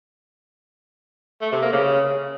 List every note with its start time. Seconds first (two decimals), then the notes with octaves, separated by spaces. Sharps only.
1.41 A3
1.52 C3
1.62 A#3
1.72 C#3